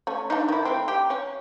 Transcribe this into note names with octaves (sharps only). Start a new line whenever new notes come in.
A3 C#4
D4 D#4
D#3 E4
A3 C4
G4
C#4